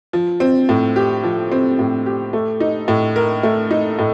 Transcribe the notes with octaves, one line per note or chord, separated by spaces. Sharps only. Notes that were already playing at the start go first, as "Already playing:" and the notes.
F3
C4
A2
G4
F3
C4
A2
G4
A3
D#4
A2
A#4
A3
D#4
A2